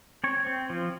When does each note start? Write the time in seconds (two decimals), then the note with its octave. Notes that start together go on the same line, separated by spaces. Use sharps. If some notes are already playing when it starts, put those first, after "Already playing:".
0.24 C4 C#5
0.47 C4
0.70 F3